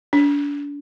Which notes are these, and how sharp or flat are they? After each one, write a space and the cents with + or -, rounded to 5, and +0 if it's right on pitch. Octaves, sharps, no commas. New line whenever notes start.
D4 -35